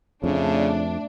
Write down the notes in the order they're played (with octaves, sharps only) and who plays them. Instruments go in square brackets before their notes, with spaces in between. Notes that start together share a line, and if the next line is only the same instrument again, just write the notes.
[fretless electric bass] F2 [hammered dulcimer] A2 [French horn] C#3 [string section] D4